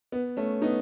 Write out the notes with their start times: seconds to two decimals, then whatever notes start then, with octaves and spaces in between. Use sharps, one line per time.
0.12 B3
0.37 A3 C#4
0.62 B3 D#4